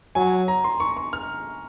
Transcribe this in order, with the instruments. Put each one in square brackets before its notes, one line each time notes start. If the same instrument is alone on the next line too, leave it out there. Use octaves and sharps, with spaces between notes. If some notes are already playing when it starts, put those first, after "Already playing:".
[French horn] F#3 [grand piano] G#5
[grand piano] A#5
C6
C#6
C#6
F6